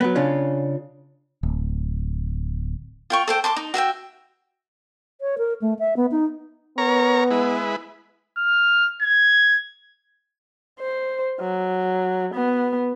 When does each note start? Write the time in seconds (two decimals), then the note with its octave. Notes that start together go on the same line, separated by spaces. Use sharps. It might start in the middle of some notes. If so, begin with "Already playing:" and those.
0.01 F#3 B3
0.15 C#3 C#4 D4 F4
1.43 D1
3.10 F4 G5 C#6
3.28 A4 C5 G5
3.44 A5 C6 D6
3.56 D#4
3.74 F#4 E5 F5 G5
5.21 C#5
5.38 A#4
5.62 A3
5.79 E5
5.97 B3
6.11 D#4
6.78 B3 A#4 C#5 A#5
7.31 G#3 E4 B4
8.38 F6
9.02 G#6
10.80 C5
11.40 F#3
12.34 B3